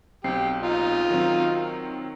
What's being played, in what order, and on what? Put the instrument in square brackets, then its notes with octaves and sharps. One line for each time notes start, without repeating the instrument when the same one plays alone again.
[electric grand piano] B1 C4 C7 [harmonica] G4
[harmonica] D#4 F4
[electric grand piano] D#3 F#3 C4